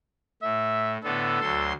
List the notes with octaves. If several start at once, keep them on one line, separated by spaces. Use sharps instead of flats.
A2 E5
A2 D3 B3 A4
D2 F#3 C6